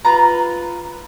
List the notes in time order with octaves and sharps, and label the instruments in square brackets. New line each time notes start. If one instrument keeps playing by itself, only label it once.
[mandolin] F4 B4 A#5